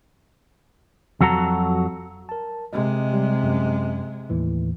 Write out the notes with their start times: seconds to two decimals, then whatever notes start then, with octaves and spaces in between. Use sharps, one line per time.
1.21 F2 F#3 F#4 A4 A#5
2.29 A#4 A5
2.73 C3 G#3 D#5
3.13 G3
3.43 F#2
4.30 D#2 A2 E3